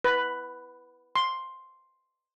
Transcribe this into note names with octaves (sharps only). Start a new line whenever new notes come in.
B4
C6